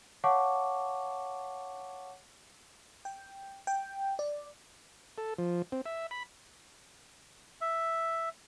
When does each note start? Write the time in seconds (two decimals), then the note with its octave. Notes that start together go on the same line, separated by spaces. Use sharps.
0.24 C#5 F5 F#5 A5 C#6 D6
3.05 G5
3.67 G5
4.19 D5
5.18 A4
5.38 F3
5.72 C4
5.86 E5
6.11 B5
7.61 E5